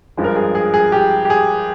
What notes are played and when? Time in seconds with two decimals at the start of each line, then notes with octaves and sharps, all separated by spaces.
0.17 G2 F3 G#3
0.24 A#4
0.36 G#4
0.55 G#4
0.74 G#4
0.92 G4
1.25 G4
1.30 G#4